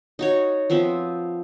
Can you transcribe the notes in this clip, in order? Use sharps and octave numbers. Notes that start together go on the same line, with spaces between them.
D#4 F#4 C#5
F3 B3 C4 E5